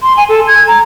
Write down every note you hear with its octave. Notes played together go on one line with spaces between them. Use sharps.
C6
G#5
A4
G#6
A#5